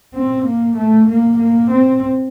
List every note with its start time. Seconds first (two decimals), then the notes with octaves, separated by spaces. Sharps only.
0.14 C4
0.45 A#3
0.77 A3
1.08 A#3
1.38 A#3
1.70 C4